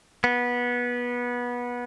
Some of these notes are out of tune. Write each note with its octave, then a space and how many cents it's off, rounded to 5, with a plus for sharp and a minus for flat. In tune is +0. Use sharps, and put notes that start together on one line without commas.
B3 -20